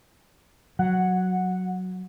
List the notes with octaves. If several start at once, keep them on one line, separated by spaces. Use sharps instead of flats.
F#3 F#5